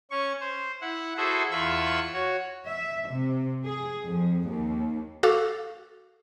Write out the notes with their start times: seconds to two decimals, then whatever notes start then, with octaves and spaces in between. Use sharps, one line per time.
0.11 C#4 C#6
0.40 C5
0.81 E4 F#5
1.17 E4 F#4 G#4 A4 C5 E5
1.51 E2 F4 E5 B5 C#6 E6
2.14 F#4 C#5
2.66 E5
3.09 C3
3.64 G#4
4.05 F2
4.49 D#2
5.23 F#4 A4 F5 D6 E6